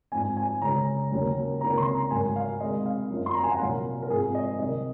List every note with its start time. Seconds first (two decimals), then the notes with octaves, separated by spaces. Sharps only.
0.12 G#2 F3 C4 G#5
0.37 G#5
0.62 C#2 C#3 G#3 C#4 A#5
1.11 D#2 C#3 F#3 C#4
1.61 C#2 C3 D#3 A#3 C#4 A#5
1.78 C6
1.94 A#5
2.10 G#2 D#3 F#3 G#5
2.36 F5
2.60 C3 D#3 G#3 D#5
2.85 F5
3.10 F#2 F3 C4
3.26 C6
3.34 A#5
3.43 G#5
3.52 F#5
3.60 C2 A#2 F#3 A#3 F5
4.02 A#4
4.10 G#2 F3 G#3 C4 G#4
4.35 D#5
4.59 C2 C3 D#3 F#3 C4 D#5